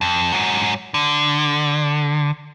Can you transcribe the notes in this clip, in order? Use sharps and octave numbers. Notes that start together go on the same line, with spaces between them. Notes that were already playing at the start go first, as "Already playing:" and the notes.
F2
G#2 F#3
D3